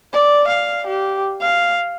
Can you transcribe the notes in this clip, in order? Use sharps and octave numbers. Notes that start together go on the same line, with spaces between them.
D5
F5
G4
F5